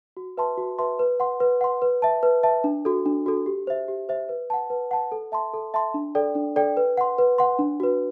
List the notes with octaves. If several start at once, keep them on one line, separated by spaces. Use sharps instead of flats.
F#4
B4 E5 A5 C6
F#4
B4 E5 A5 C6
B4
F#5 C6
B4
F#5 C6
B4
E5 A5
B4
E5 A5
D4
F#4 A4
D4
F#4 A4
G4
C5 E5
G4
C5 E5
B4
F#5 A5
B4
F#5 A5
A4
E5 A5 C6
A4
E5 A5 C6
D4
A4 D5 G5
D4
A4 D5 G5
B4
F#5 C6
B4
F#5 C6
D4
F#4 B4